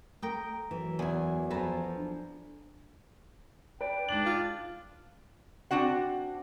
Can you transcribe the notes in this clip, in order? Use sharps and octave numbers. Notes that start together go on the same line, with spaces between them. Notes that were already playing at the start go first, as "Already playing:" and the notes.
A3 A#4 G5 D#6
F#2 E3
E2 G#4 G#5
F3 A4 B4 G#5 A#5
D4
B4 D5 G5
G#2 D4 F#7
F4
C4 D4 F#4 F#5